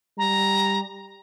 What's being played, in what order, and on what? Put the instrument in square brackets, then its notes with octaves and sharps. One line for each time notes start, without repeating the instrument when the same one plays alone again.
[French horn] G3 [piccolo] A#5